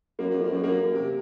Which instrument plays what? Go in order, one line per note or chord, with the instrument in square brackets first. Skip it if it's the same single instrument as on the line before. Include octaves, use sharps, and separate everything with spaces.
[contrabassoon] F#2 [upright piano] A#3
[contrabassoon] F#2
F2
F#2
[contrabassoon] F#2 [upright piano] A#3
[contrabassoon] C3